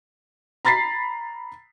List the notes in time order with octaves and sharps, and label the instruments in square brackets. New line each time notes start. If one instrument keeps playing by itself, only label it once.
[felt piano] A#5 B5 A6 B6 C7